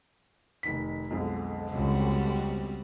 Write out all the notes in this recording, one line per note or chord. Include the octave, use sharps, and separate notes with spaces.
F1 D#3 B6
B1 F2 D3 G#3
C#2 G3 C4 F#4